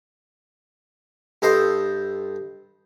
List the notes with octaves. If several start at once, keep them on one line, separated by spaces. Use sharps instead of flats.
G2 A4 C5 D#5 G5 C6